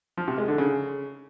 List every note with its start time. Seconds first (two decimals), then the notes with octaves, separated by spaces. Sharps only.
0.17 F3
0.28 C3
0.38 G#3
0.48 D3
0.58 C#3